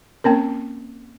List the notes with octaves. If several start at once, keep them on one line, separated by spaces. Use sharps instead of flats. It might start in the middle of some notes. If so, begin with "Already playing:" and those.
A#3 C4 C#4 A#4